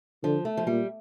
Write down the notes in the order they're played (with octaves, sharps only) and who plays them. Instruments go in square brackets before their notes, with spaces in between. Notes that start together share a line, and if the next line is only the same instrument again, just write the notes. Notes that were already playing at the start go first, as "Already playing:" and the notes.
[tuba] D3 [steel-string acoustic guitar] F3
[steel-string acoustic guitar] A3
F3
[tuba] A#2 [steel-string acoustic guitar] G3